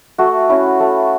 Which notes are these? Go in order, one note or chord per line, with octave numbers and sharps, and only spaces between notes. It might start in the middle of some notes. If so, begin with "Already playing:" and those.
A3 F#4
C#4 E4
A3